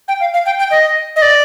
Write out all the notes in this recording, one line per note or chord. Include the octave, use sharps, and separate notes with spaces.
G5
F5
F5
G5
G5
D#5
D#5
D5